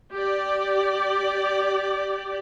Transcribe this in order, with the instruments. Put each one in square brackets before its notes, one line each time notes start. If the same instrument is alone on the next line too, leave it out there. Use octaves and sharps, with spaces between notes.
[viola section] G4 D5